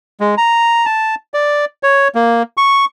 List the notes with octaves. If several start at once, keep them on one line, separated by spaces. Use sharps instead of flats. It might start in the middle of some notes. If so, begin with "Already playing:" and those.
G#3
A#5
A5
D5
C#5
A#3
C#6